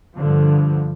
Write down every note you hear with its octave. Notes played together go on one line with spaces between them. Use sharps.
G2 D3 F3